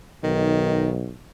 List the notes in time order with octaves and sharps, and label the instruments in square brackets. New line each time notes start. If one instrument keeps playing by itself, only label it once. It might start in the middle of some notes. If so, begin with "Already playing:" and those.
[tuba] B1 [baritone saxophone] D#3